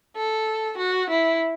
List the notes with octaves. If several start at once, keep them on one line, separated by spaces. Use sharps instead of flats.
A4
F#4
E4